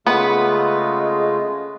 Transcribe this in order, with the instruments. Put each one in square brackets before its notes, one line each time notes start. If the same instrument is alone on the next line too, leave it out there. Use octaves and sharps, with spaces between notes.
[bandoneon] C#3 A3 F4 [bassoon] G#3 [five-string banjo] B3 [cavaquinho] B4 F#5